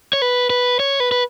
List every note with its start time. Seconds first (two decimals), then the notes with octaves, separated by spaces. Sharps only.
0.13 C#5
0.22 B4
0.50 B4
0.80 C#5
1.00 B4
1.12 B4